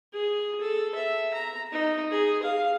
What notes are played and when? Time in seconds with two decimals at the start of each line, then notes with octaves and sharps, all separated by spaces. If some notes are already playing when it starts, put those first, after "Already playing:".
0.13 G#4
0.61 A4
0.95 E5
1.34 A#5
1.72 D#4
2.11 G#4
2.43 F5